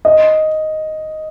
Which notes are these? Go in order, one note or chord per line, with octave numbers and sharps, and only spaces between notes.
D#5